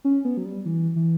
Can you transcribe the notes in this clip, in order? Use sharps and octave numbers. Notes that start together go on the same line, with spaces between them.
C#4
B3
F#3
G3
E3
E3